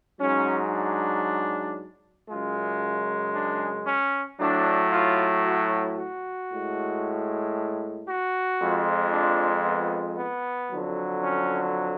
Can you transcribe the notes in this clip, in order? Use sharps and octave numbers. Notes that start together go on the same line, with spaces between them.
G#2 F#3 C#4
D4
F#2 C#3 G#3 F4
D4
C#4
A2 F#3 D4
F4
F#4
F#4
A2 G#3
F#4
F2 F3 G#3
D4
B3
B3
F2 D3 F#3
C#4